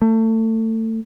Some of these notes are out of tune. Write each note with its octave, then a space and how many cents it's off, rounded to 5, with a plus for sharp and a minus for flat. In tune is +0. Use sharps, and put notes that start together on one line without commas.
A3 +25